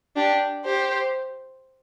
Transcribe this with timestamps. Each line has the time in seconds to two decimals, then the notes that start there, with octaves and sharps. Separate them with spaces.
0.16 D4 G4
0.64 G4 C5